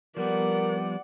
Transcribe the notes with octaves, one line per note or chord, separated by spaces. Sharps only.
F3 G3 B3 A#4 D5 F#5